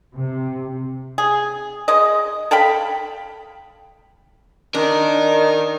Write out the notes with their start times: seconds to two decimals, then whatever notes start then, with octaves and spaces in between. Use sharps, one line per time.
0.15 C3
1.18 G#4
1.88 G#3 D#5
2.51 A4 F5 G5 B5
4.75 D#3 D4 A#4